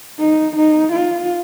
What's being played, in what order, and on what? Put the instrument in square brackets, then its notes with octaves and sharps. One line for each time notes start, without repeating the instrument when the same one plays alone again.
[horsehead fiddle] D#4
D#4
F4